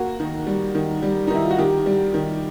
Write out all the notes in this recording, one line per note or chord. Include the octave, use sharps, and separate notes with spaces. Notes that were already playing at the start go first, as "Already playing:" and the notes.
Already playing: A#3 F#4
D#3
G3
D#3
G3
D#4
D#3 E4
F4
F#4
D#3 G4
G3
D#3